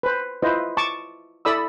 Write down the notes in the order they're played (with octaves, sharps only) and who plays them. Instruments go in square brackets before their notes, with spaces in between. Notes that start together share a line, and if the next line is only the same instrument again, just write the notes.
[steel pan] B4 C5
E4 F4 B4 C5 D#5
A5 C#6 D6
E4 A4 D5 B5 D#6 E6